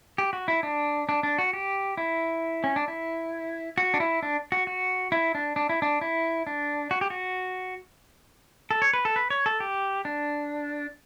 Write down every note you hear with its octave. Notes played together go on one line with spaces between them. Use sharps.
G4
F#4
E4
D4
D4
D4
F#4
G4
E4
C#4
D4
E4
F#4
D4
E4
D4
F#4
F#4
E4
D4
D4
E4
D4
E4
D4
F#4
G4
F#4
A4
C#5
B4
A4
B4
C#5
A4
G4
D4